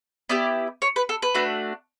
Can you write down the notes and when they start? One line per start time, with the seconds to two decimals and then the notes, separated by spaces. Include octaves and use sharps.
0.29 B3 E4 G4 D5
0.82 C#5
0.96 B4
1.09 A4
1.22 B4
1.35 A3 D4 F#4